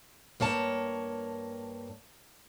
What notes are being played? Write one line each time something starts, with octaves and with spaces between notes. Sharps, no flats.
G2 A#3 C#5 A5